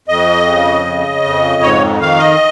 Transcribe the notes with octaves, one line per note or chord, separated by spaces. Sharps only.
F2 D#5
C#3
C#3
F2
G#2 C#5
D#3 F5
D#5